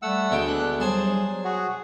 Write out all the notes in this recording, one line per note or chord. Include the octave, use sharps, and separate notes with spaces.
G3 A3 F#5 E6
D2 G#3 B3 G5
D4 F#6
F#3 G3 G#4 C5 G#5 A5
F#4 G#4 F#5